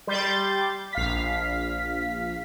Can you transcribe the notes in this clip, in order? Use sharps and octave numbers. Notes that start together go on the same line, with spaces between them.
G3 C6 G6 A6
A#1 F5 B6